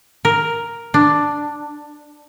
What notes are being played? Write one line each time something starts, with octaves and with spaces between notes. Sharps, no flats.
A#4
D4